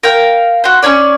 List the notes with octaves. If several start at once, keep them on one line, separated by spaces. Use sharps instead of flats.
A#4 F5 G5
F#4 C5
C#4 D4 C#5 D5